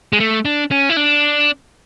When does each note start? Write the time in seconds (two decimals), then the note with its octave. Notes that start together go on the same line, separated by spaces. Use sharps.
0.13 G#3
0.20 A3
0.45 D4
0.71 C#4
0.90 E4
0.97 D4